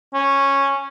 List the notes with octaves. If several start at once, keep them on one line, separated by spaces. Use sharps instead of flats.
C#4